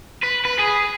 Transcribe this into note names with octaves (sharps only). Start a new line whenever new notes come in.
B4
B4
G#4